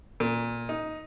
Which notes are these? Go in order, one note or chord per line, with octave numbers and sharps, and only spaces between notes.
A#2
D#4